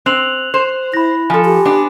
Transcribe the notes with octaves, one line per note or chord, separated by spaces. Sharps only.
C4 F#6 F7 F#7
C5
E4 B5 A#6
F3 A4 G#5 C6
G4
B3 D4